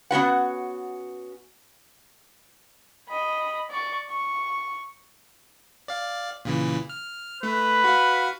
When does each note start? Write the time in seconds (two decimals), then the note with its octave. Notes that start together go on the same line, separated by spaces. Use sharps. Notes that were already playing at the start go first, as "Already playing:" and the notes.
0.11 B3 C#4 F#4 F#5
3.08 D#5 B5
3.70 D5 C#6
4.09 C#6
5.88 D5 F5
6.45 A#2 C#3 E3
6.89 F6
7.43 A3 B4
7.84 F#4 F5